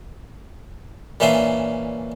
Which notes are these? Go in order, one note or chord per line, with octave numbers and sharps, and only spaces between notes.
A#2 E3 C#4 D4 E5 C6